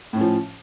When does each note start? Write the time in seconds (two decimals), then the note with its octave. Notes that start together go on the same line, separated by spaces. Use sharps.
0.13 A2
0.17 C#4
0.21 F3